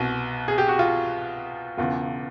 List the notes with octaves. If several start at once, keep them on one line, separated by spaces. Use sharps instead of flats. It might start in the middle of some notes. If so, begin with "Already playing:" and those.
Already playing: C2 B2
G#4
G4
F#4
F4
E1 E2 C#3 F4